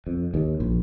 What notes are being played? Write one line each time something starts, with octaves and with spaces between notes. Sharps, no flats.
F2
D#2
A#1